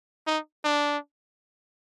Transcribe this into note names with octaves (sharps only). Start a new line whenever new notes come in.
D#4
D4